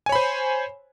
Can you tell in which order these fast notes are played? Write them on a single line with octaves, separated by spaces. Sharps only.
G#5 C#5 B5 C5